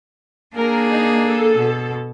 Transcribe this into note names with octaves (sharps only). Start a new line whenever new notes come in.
A#3 D4 G#4 A#4
D#4
A4
B2